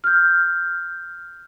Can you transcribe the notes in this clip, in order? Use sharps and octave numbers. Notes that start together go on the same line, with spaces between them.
F6 G6